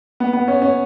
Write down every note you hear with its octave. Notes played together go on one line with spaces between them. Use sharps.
B3
B3
C#4
C#4